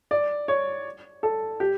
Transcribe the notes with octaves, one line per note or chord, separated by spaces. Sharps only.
D5
C#5
A4
G4